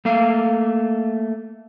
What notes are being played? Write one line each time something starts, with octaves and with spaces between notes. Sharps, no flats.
A3 A#3 F5